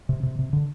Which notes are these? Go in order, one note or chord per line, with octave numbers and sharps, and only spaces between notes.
C3
C3
C3
D3